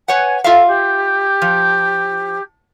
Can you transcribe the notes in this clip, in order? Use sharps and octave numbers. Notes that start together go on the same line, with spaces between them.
B4 C#5 F#5 G#5
F4 A4 E5 F5
G4
F3